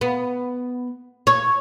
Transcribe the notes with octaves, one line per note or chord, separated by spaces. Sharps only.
B3
C#5